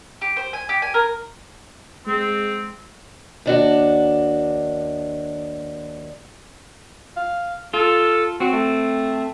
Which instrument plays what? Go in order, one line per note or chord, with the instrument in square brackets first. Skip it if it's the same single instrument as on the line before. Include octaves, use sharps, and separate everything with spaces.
[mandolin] G4
C5
G#5
G4
G#5
A#4
[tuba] G#3 [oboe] C4
[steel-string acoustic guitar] D#2 D4 F#4
[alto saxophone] F5
[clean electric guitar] F4 [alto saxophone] A4
[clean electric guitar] C4 [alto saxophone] F#4
[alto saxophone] A3